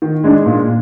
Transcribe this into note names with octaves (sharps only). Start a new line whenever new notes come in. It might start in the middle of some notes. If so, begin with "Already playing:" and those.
D#3
G#3 D4
A#2